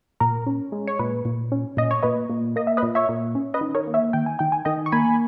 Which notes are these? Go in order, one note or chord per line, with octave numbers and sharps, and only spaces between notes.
A#2 A#4
C#4
G#3
C#5
A#2 B4
A#2
C#4
A#2 D#5
C#5
A#2 B4 D#5
A#2
A#3 D#5
E5
B4 D#5
A#2
C#5 E5
A#2
C#4
B4 D#5
D#3
A#4 C#5
A#3
C#5 E5
D#3 G5
G#5
D#3 G5
G#5
D#3 D#5 G5
C#6
A#3 G#5 B5